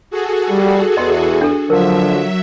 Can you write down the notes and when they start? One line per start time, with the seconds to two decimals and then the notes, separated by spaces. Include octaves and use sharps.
0.10 F#4 G#4 A4
0.50 G3
0.97 E2 D#5 C6
1.41 D4 A4
1.70 D3 F3 F#3 A#4 E5